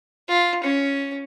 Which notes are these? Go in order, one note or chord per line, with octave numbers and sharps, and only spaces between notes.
F4
C#4